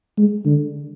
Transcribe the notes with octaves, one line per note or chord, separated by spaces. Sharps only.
G#3
D3